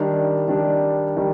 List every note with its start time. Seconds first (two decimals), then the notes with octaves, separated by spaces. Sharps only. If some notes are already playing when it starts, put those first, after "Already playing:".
Already playing: D#3 G3 D4
0.48 D#3 G3 D4
1.17 D#3 G3